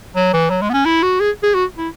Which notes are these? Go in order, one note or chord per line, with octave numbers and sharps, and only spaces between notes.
F#3
E3
F#3
G#3
B3
C#4
E4
F#4
G#4
G#4
F#4
E4